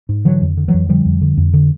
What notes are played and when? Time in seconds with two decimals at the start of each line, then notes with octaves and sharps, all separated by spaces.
0.09 G#2
0.25 D3 E3 F#3
0.41 F2
0.57 D3
0.68 E3 F#3
0.74 F2
0.89 D3 F3 G3
1.06 F2
1.22 D3
1.37 F2
1.54 D3